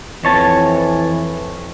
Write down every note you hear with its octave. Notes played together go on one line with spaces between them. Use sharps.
F2 E3 C#5 A5